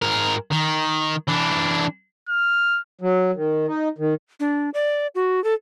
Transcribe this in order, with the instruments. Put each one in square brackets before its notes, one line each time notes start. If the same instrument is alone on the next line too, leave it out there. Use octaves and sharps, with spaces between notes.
[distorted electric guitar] G#2 A#4
D#3
E3 D4
[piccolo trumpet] F6
[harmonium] F#3
D#3
D#4
D#3
[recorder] D4
D5
F#4
A4